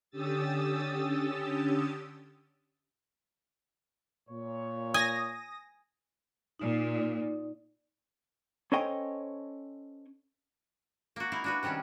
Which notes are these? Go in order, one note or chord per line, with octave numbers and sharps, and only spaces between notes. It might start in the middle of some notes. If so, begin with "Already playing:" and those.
D3 C#4 G4 D#6 E6 A6
A#2 C#5
G#5 D#6 A#6
A#2 D#4 D5
C#4 A4 C5 C#5 D#5 G5
A#3 F#4
D#4 E4 F5
D4 F#4 B4
C3 D#3 G3 C#4 D4